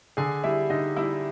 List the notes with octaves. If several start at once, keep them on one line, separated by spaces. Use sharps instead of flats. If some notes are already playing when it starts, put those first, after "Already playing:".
D3 G#4 G#5
G3 E4 E5
D3 D#4 D#5
G3 E4 E5